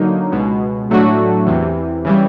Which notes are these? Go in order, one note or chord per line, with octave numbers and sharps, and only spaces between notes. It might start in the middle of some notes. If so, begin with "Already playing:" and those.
Already playing: D3 F#3 A#3 D#4
C#2 B2 G#3
A2 F#3 A3 D4 F#4
E2 C3 E3
C#3 E3 G3